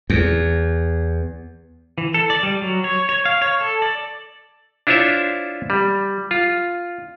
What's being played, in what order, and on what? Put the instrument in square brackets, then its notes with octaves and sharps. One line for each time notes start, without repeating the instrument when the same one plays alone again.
[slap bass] E2
[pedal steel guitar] E3
A4
D5
G3
F#3
C#5
C#5
F5
C#5
A4
D5
[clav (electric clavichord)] D4 E4 F4 C5 C#5 E5
G3
F4